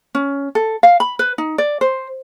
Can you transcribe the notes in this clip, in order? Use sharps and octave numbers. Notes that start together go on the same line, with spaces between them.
C#4
A4
F5
B5
B4
D#4
D5
C5